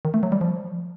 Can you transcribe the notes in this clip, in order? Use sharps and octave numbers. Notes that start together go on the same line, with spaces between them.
D#3
A3
F#3
G3
F3